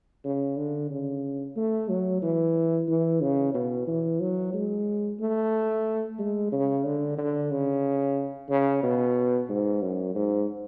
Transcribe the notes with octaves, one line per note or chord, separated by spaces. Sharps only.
C#3
D3
C#3
A3
F#3
E3
E3
C#3
B2
E3
F#3
G#3
A3
G#3
C#3
D3
D3
C#3
C#3
B2
G#2
F#2
G#2